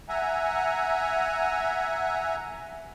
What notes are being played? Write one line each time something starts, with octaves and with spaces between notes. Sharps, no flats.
E5 F#5 G#5 A#5